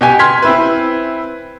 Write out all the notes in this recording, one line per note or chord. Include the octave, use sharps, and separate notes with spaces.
B2 G4 G#5
C6 F6 G#6 B6
C4 E4 B4